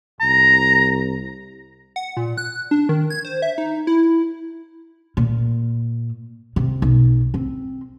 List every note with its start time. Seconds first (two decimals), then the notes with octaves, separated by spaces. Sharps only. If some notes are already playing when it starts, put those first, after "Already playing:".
0.21 C2 A#5
1.96 F#5
2.17 A#2
2.37 F#6
2.71 D4
2.89 D#3
3.10 G#6
3.25 C5
3.42 E5
3.58 D#4
3.87 E4
5.17 A#2
6.56 C3
6.82 B1
7.34 C4